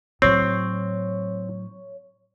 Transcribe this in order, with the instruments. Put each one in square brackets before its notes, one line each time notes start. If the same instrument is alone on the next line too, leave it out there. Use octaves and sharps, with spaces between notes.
[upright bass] A2 F#3 [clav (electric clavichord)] C4 [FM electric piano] C#5